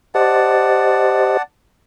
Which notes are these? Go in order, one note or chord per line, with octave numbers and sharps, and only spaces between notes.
G4 C5 D5 D#5 F#5 A5